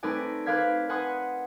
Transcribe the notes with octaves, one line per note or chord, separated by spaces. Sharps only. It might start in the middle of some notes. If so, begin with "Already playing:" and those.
A3 C4 D#4 B4 D5 G#5
B4 C5 D5 F5 G#6 B6
B4 F#5 G#5 C6 D#6